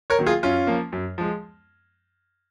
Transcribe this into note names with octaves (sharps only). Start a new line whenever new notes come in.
A#4 C#5
D#3 F#3 A#3
F4 G#4
F#2 C#4 F4
F3 A#3
F#2
F3 G#3